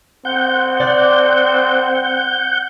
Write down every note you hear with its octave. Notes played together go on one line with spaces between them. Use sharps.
C4 F#5 G6
D5